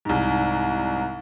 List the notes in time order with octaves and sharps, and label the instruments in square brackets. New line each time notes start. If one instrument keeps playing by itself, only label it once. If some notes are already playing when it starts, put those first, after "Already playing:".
[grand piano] C2 G#2